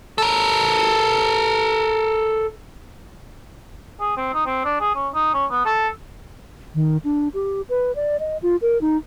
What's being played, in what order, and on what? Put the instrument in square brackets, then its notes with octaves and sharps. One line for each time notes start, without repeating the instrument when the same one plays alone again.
[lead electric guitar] A4 A#4
[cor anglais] G#4
C4
D#4
C4
D4
G#4
C#4
D#4
C#4
B3
A4
[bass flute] D#3
D4
G4
B4
D5
D#5
F4
A#4
D#4